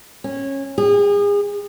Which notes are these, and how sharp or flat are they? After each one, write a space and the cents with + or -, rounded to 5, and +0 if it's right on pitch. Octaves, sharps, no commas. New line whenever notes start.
C#4 -20
G#4 -35